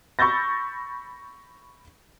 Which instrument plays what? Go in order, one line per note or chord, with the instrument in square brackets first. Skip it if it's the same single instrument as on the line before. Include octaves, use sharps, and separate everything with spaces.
[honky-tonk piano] B5 C#6 E6 G6 A6 A#6